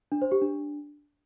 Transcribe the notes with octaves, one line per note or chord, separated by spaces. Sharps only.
D4
C5
G4
D4